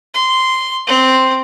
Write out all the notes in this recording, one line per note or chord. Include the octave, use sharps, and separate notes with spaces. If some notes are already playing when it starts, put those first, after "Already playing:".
C6
C4